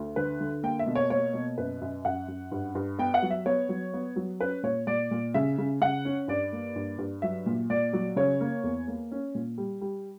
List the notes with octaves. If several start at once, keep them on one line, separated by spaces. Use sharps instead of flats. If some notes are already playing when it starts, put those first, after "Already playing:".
Already playing: D2
D3 B4
D3
A#3 G5
E5
B2
C#5
A#3 C#5
B2
F#2 B4
F#2
F#2 F#5
F#2
G2
G2
B3 G5
F#5
F#3
E5
B3 C#5
F#3
B3
F#3
C#4 B4
A#2 C#5
A#2 D5
A#2
C#3 E5
C#3
C#3 F#5
C#4
G2 D5
A#3
G2
G2
F#3 E5
A#2
A#2 D5
F#3
C#3 C#5
A#3
E2
A#3
C#4
A#2
G3
G3